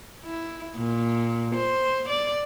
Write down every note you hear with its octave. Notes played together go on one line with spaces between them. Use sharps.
E4
A#2
C5
D5